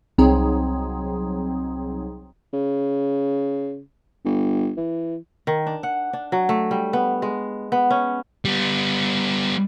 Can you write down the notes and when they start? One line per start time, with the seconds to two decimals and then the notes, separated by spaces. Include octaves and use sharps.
0.18 C2 F#3 C4 D#4 G#4
2.54 C#3
4.25 G1
4.77 E3
5.47 D#3
5.67 D4
5.83 F#5
6.13 D4
6.32 F#3
6.49 A3
6.71 G3
6.93 B3
7.22 G#3
7.72 B3
7.91 C#4
8.45 G3 B3